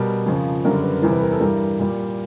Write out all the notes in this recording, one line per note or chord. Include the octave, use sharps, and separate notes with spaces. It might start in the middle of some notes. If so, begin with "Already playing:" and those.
Already playing: B2 G3 A#4
F2 C#3 F3
F#2 D3 G3 A#4
B4
E2 C3 E3 G3 A#4
B4
A#4
A4
G2 E3 G3 A#4
A#2 G3